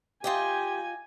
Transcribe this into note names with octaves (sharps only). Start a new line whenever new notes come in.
F4 G4 D#5 G5 G#5